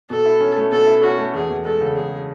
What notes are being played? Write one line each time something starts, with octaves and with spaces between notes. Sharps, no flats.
B2 A4
E4
C#4
A3
B2 A4
E4
C#4 F#4
A3
E2 G#4
E2
G#3 A4
C#3
E2 G#4